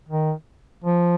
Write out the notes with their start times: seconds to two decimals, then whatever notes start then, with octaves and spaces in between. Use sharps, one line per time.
0.08 D#3
0.84 F3